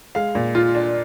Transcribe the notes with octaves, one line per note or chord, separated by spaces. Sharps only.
G#3 F5
A#2
F4
D4